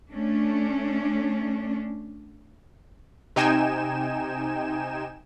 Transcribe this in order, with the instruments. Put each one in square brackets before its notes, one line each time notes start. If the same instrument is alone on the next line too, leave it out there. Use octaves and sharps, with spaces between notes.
[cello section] A3 C#4 D4
[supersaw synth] C3 D#4 G5 G#5 E7